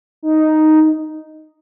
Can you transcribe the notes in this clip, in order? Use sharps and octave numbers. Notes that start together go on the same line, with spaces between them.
D#4